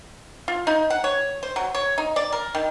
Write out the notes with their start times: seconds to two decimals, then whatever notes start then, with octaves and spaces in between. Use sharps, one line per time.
0.48 F4
0.67 D#4
0.90 F#5
1.04 C#5
1.43 C5
1.56 F#3
1.74 C#5
1.98 D#4
2.16 D5
2.33 A#4
2.55 D#3